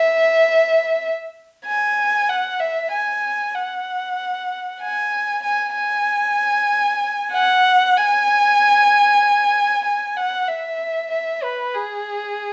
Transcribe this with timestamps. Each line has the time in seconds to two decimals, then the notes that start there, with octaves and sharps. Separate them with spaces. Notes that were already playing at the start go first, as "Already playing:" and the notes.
Already playing: E5
1.66 G#5
2.29 F#5
2.60 E5
2.91 G#5
3.55 F#5
4.80 G#5
5.44 G#5
5.75 G#5
7.32 F#5
7.97 G#5
9.85 G#5
10.16 F#5
10.48 E5
11.11 E5
11.43 B4
11.74 G#4